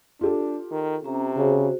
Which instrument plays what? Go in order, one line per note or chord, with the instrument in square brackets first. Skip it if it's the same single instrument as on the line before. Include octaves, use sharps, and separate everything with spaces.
[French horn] D4 [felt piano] F4 G4 A4
[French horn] D#3
[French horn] C3 [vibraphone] C#4 A#5
[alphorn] C#3 [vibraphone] F#4 G#4 C5